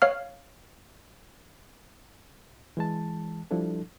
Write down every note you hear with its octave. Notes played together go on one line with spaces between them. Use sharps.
C#5 F5 F6
E3 G#3 A5
F3 G3 D4 E4 A4